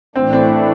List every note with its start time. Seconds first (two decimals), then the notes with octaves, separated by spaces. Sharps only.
0.15 A2 E3 A3 C4 D4
0.33 C4
0.50 C4